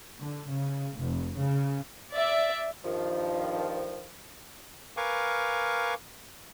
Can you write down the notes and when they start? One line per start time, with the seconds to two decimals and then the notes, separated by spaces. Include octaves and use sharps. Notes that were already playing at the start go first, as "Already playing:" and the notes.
0.21 D3
0.50 C#3
0.98 F1
1.36 C#3
2.13 D5 E5
2.84 G2 D#3 F3
4.97 A#4 B4 F5 G#5 C#6 D6